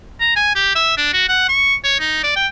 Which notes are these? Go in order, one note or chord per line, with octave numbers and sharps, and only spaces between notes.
A#5
G#5
G4
E5
D4
F#4
F#5
C#6
C#5
D#4
D5
G5